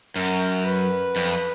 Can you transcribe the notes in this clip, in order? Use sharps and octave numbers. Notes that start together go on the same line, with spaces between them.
F#2 A#4
B4
F2